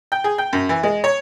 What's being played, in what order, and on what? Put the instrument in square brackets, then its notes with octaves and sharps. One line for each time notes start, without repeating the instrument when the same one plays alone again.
[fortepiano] G5
G#4
G5
F#2
E3
G#3
C#5